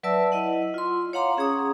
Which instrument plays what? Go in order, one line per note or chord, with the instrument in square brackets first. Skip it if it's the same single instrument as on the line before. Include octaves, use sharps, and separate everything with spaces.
[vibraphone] F#3 B4 D5 E5 A5 E6
E4 D#5 F#5
F4 C6
C#5 F5 F#5 A#5 C6 D6
C#4 G#4 A#5 D#6